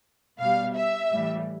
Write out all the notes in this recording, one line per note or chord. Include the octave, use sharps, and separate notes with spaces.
B2 G3 F5
E5
A2 E3 G3